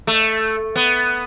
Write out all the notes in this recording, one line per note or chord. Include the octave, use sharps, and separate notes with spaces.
A3
B3